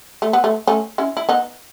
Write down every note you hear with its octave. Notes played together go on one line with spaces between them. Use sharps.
A3
B3
A3
A3 C#4
C#4 E4
E4
B3 D#4